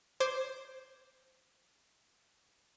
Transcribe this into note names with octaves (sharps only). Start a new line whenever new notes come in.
C5 D6 G#6